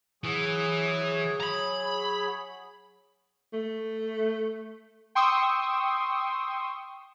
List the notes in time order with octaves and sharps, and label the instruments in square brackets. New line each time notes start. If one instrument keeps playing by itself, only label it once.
[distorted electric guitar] E3 [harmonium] F#3 G#4 C#5
[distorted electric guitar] A#5 B5
[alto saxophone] A3
[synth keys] G5 C6 C#6 D#6 E6